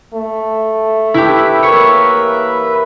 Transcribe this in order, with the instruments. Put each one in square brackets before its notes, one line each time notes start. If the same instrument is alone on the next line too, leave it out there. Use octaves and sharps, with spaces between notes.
[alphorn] A3
[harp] E4 G4 [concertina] B4 E5 B5
[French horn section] E3 A#3 A#4 [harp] C#5